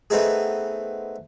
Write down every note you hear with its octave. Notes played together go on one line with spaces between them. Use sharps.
A3 B3 C4 D#4 G#4